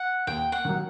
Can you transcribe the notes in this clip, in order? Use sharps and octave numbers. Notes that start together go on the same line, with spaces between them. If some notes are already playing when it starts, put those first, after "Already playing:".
Already playing: F#5
D#2 G5
F#5
D#3 F#3